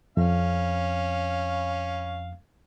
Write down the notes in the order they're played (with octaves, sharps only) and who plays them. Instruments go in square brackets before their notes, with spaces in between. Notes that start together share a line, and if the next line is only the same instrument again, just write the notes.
[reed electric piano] F2 [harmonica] C#4 F5